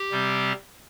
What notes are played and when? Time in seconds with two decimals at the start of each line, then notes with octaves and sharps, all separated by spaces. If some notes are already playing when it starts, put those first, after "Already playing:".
Already playing: G4
0.11 C3 G3 C4